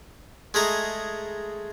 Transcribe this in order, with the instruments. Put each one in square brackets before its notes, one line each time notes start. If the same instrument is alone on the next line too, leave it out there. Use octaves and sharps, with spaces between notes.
[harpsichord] G#3 A3 G#4 A#5